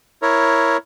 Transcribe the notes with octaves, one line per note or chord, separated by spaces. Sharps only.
E4 A#4 C#5